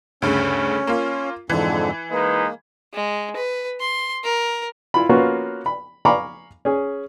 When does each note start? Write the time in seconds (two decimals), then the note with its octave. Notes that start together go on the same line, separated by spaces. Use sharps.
0.22 D2 G2 C#3 C#4
0.87 A#3 F4
1.50 F2 G#2 D3 E3
2.11 G#3 A#3 D#4 B4
2.94 G#3
3.36 B4
3.80 C6
4.24 A#4
4.94 E4 F4 B5
5.09 A#3 B3 C#4 F4 F#4
5.66 B5
6.05 F5 G#5 A#5 B5 C#6 D6
6.65 C#4 G#4